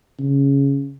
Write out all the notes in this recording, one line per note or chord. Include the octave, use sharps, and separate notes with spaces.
C#3